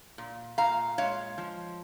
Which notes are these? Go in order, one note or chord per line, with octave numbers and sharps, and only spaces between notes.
A#2
A#2 F5 A#5
G#3 C#5 F5
F3